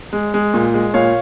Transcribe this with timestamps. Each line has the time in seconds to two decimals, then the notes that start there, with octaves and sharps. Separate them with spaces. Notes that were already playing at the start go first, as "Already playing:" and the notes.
0.13 G#3
0.34 G#3
0.54 A#2
0.74 G#3
0.94 A#2 C#5 F5